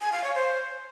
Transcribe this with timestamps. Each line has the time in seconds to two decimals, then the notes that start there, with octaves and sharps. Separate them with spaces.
0.01 G#5
0.12 F5
0.24 C#5
0.35 C5